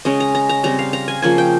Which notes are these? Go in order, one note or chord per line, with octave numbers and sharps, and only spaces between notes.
C#3 G#3 C#4 D#5
A#5
A#5
A#5
C#3 G3 C4 A#5
F5
A#5
G#5
C#3 F3 A#3 G#5
G5